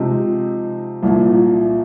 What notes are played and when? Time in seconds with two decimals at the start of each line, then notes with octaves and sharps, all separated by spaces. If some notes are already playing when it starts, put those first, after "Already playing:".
Already playing: C3 F3 G#3 D#4
1.03 C2 A#2 F3